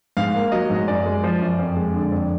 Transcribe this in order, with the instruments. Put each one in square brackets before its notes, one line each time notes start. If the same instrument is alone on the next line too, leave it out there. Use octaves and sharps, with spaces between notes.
[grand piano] G#2 F5
A#3
F#3 D#5
G#2
F#2 D5
G#3
F3
F#2
F2
G#3
D3
F2